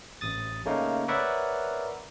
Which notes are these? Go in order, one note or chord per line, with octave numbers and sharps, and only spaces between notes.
A1 D#6 A6
C#3 A3 A#3 D#4 A#4
A#4 B4 C#5 D5 E5 F#5